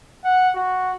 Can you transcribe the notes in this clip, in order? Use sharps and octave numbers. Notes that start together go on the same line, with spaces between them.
F#5
F#4